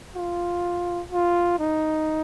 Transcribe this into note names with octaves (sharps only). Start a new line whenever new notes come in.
F4
F4
D#4